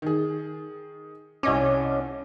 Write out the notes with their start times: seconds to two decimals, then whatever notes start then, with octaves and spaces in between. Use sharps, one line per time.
0.02 D#3 G#4
1.43 C2 C#4 D#5 D6